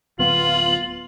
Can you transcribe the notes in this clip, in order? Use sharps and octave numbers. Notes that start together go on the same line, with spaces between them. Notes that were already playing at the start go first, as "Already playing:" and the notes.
D1 B3 F4 F#7